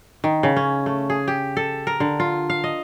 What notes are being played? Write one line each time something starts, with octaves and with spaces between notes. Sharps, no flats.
D#3
C#3
C#4
A3
G#4
G4
A4
A#4
D3
F4
F5
D#5